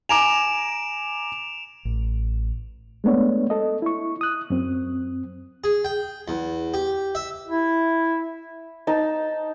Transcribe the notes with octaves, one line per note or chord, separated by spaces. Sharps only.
G#5 A#5 D6 D7 E7 F7
A1
G#3 A3 B3 D4 C#5
A4 D#5
E4 C#6
D#6 F#6
F#2 C4
G#4
G5
E2
G4
E5
E4
D#4 A5